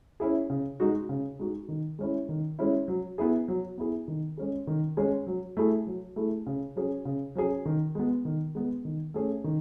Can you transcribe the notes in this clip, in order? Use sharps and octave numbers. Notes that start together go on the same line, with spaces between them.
C#4 E4 G#4
C#3
G#3 D#4 F#4
C#3
G#3 D#4 F#4
D#3
G#3 C#4 E4
D#3
G#3 C#4 E4
F#3
B3 E4 G#4
F#3
B3 E4 G#4
D#3
G#3 C#4 G#4
D#3
G#3 C#4 G#4
F#3
A3 E4 G#4
F#3
A3 E4 G#4
C#3
F#3 C#4 G#4
C#3
F#3 C#4 G#4
D#3
G#3 B3
D#3
G#3 B3
D#3
A3 C#4 G#4
D#3